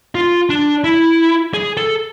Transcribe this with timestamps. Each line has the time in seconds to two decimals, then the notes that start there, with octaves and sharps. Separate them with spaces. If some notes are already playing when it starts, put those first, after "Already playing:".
0.15 F4
0.49 D4
0.84 E4
1.54 G#4
1.77 A4